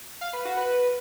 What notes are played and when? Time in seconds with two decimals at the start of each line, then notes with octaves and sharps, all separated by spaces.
0.21 F5
0.33 B4
0.45 F#4
0.57 B4